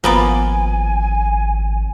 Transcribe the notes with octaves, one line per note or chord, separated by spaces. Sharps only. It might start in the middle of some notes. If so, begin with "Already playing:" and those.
G#1 F3 A#3 B3 D5 G#5